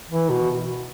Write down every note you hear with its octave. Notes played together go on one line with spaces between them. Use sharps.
E3
B2